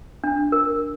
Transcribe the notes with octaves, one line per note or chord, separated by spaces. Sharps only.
D4
A#4